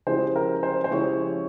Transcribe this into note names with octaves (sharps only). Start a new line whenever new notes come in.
C#3 F3 G#3 E4 G4 C5
A#4
C5
C5
C#3 F3 G#3 E4 G4 C#5